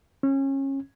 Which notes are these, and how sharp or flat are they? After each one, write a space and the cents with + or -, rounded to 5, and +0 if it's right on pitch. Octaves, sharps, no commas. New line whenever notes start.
C#4 -25